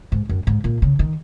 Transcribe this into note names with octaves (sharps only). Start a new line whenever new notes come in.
G#2
F#2
G#2
A#2
C#3
D#3